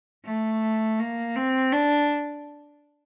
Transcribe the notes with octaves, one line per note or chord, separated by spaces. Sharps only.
A3
A#3
C4
D4